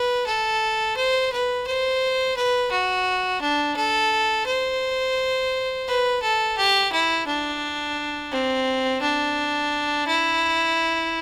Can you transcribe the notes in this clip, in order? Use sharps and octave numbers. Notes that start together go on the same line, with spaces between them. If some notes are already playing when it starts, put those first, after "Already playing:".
Already playing: B4
A4
C5
B4
C5
B4
F#4
D4
A4
C5
B4
A4
G4
E4
D4
C4
D4
E4